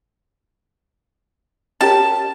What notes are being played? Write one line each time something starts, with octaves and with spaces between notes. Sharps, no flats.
C#4 G4 A#4 A5